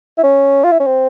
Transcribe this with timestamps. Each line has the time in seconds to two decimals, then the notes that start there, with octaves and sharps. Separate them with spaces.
0.18 E4
0.23 C#4
0.64 F4
0.72 E4
0.80 C#4
0.86 C4